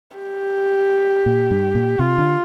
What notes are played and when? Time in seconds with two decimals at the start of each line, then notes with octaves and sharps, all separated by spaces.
0.17 G4
1.26 A#2
1.51 G2
1.75 A#2
1.99 C3 F4
2.18 D3